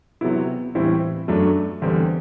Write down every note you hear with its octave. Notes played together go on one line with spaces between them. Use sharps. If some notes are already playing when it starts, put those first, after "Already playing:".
C3 F#3 B3 E4
A2 E3 G3 C4 E4
F#2 F#3 A3 D4
E2 D3 G3 C4